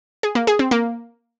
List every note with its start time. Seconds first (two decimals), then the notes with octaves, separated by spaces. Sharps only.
0.23 G#4
0.35 A#3
0.47 G#4
0.59 C4
0.71 A#3